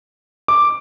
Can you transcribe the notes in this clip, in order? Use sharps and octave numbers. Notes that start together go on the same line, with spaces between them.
D6